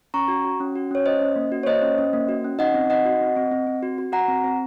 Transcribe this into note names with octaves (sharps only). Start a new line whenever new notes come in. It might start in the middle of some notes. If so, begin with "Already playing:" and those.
C#4 A#5 C#6
F#4
F#4
C#4
F#4
C#4 C#5
C#4 C5 D#5
C#4
A#3
F#4
C#5
A#3 C5 D#5
C#4
C#4
A#3
F#4
C#4
D#4 D#5 F#5
C4
D#4 D#5 F#5
F#4
C4
C4
C4
C4
F#4
F#4
F#4 F#5 A#5
C4
C4